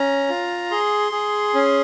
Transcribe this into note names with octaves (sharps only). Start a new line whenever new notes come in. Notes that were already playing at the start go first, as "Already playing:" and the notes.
Already playing: C#4 A#5
F4
G#4 C6
G#4
C#4